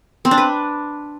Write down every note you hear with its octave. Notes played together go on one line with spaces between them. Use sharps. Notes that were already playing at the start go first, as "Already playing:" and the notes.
C4
D4
B4